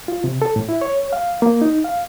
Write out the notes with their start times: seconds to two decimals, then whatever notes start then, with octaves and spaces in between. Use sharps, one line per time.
0.08 F4
0.24 C3
0.42 A4
0.56 A2
0.69 E4
0.82 C#5
1.13 F5
1.42 A#3
1.62 D#4
1.84 F5